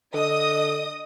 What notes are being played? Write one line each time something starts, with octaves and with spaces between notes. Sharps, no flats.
D3 D#5 D#6